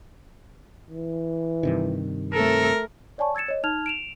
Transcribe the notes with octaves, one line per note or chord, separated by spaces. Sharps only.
E3
G2 C3 D#3
A3 C4 A4 A#4
C#5 D5 G#5 A5 C#6
E6 G#6 A6 C#7 E7
C#5 D#5
D#4 A5 F6 G#6 F7
D7 E7 F7